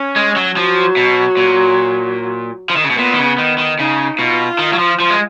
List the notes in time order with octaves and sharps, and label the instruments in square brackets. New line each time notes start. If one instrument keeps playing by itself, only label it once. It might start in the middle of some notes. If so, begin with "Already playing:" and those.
Already playing: [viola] C#4
[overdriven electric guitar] G#3
F#3
[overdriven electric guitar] F3 [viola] F#3
[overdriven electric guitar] B2
A#2
F3
D#3
C#3
B2
[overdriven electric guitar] A#2 [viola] B3
[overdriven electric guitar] D#3
C#3
D#3
D#3
[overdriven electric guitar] C#3 [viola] D#4
[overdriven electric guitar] B2 [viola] F4
[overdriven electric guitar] D#3
F#3
F3
F3
G#3